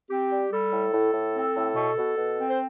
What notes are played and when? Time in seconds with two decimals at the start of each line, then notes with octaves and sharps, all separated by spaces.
0.10 C4 G4
0.30 G3
0.52 G3 A4
0.71 A2
0.93 A2
1.12 A2
1.34 C4
1.54 A2
1.74 B2
1.96 B2
2.16 B2
2.37 C4
2.47 C5